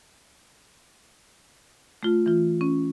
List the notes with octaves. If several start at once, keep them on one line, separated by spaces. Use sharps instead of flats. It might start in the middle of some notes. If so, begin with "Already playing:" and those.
A3 F4
E3 F4
C#4